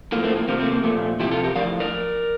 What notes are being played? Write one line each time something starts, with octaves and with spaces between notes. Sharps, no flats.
A2 F3 A#3
A3 C4
A#3
C3 F3 A#3
A3 C4
A#3
A#2 F3 A3
C3 F3 E4 G4
F4 A4
G4 A#4
A2 F3 D5 F5
A#4 D5